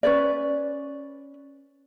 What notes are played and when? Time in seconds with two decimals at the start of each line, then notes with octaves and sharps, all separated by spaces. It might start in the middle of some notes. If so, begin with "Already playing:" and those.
0.03 C#4 B4 D5